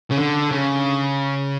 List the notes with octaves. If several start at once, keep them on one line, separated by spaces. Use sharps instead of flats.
C#3
D3
C#3